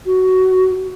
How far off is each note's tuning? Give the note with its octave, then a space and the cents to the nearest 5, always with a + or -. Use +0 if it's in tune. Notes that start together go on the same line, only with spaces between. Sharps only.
F#4 +10